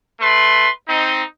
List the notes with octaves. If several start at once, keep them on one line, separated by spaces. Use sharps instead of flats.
A3 B4 C6
C4 D#4